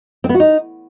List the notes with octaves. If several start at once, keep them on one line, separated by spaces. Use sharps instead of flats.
C4
B3
F#4
D#4